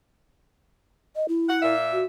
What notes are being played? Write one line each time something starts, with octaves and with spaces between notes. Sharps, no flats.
D#5
E4
F#5
A#2 E5
F#4